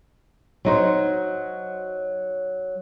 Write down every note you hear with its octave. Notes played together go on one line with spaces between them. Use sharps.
F#3 D#4 C5